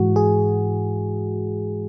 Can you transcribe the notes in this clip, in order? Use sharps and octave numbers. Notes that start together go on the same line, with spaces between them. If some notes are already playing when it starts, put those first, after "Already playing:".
Already playing: G#2 E3 G#3 F#4
G#4